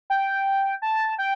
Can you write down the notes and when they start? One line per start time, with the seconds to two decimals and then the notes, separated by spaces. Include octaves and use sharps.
0.10 G5
0.82 A5
1.18 G5